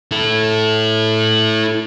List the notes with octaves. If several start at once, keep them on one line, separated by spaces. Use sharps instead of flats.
E4 A4